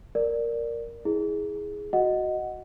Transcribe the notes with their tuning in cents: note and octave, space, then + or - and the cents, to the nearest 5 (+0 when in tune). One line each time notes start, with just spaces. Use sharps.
A#4 +0 D5 +0
E4 -20 G#4 +0
F#4 +0 D#5 +0 F#5 +0